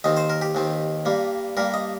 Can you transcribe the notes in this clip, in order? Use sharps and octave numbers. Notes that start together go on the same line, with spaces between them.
D#2 D#3 C4 D#5
C5
A#4
G4
D#2 D#3 C4
G2 G3 A#3
G2 G3 A#3 A#4
D#5